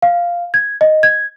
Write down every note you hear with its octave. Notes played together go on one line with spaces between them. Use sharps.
F5
G#6
D#5
G#6